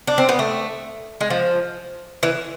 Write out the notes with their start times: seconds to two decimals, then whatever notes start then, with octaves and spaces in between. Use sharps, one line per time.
0.07 D4
0.18 C4
0.29 B3
0.39 A3
1.21 G#3
1.30 F3
2.23 E3